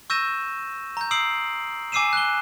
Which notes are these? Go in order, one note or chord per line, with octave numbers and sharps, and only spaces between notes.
C#6 E6 G6 A#6 D#7 E7
A#5 G6
D#6 E6 C7 D7 F#7
G#5 D6 E6 C7 D#7 E7
F#6 G7